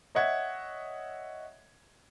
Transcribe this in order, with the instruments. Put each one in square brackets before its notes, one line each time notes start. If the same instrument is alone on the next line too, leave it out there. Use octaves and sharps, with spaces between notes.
[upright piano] C#5 D#5 E5 F#5 G#6